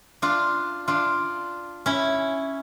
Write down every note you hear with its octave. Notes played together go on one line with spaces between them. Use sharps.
D4 F4
D4 F4
C#4 E4